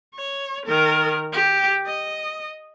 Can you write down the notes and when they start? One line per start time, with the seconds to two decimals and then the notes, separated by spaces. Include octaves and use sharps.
0.15 C#5
0.66 D#3 A#4
1.32 G4
1.86 D#5